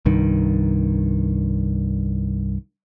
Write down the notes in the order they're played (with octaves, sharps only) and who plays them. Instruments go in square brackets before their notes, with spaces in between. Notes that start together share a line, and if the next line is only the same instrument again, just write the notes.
[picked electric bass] C2 G2 D#3